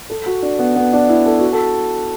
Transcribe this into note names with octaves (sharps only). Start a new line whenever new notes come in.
A4
F#4
D4
B3
B3
D4
E4
A4
F#4
A4